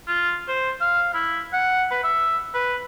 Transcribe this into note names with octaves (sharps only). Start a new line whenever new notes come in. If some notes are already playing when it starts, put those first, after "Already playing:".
F4
C5
F5
E4
F#5
B4
E5
B4